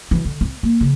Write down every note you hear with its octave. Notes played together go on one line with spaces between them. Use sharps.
F#2 E3
D3
A#3 C4
A#3
C#3 F3